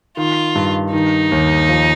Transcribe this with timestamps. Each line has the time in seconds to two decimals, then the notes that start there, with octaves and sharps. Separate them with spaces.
0.17 D#3 F4
0.55 G2
0.93 D#3 D#4
1.32 D#2
1.69 F3